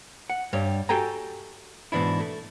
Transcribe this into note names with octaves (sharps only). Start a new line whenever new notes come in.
F#5
G2 G3 C#5
F#4 G4 A4 G5 G#5 A#5
G#2 B2 E3 D4 E4
A3